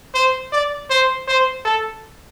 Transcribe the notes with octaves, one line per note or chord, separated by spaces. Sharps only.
C5
D5
C5
C5
A4